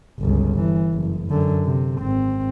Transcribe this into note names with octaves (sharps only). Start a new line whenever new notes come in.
G1 C#2
E3
F#1
F#2 D3
C3
G#1 C4